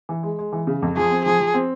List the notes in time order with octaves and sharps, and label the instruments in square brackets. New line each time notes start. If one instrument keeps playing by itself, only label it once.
[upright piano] E3
G#3
G#3
E3
C#3
F2
[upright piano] F3 [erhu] G#4
[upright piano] C4
[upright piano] F3 [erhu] G#4
[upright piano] F3
C4